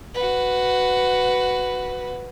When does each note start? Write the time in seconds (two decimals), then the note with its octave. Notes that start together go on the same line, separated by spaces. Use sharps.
0.14 F#4 B4